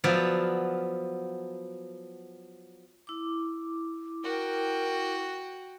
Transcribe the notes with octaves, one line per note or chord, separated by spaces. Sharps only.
F3 F#3 B3 D5 E5 F5
E4 D6
F#4 A#4 G5